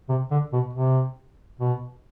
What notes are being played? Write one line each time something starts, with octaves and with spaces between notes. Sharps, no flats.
C3
D3
B2
C3
B2